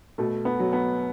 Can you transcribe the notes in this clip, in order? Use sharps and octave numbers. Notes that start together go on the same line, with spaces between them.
B2 A3
B3
F#3
B3